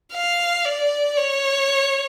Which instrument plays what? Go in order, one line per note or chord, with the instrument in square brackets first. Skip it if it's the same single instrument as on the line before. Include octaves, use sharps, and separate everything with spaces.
[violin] F5
D5
C#5